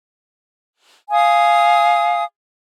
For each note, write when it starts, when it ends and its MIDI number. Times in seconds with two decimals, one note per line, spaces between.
1.11 2.24 77
1.11 2.24 80
1.11 2.24 87